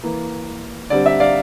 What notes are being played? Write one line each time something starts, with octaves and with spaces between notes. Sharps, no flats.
E3 A#3
D3 G3 C4 D5
E5
D5 F5